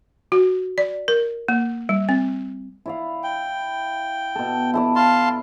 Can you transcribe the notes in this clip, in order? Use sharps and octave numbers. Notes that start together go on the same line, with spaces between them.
F#4
D5
A#4
A#3
G3
C4
E4 D5 F5
G5
B2 A4
E4 A4 D5
F5 A5 C6